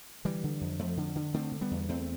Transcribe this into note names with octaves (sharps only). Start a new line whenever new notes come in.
D3 E3 G3
D3
F2
F2 F3 A3
D3
D3
D3 A3 C4
D3
G3 B3
E2
E2 A3 C4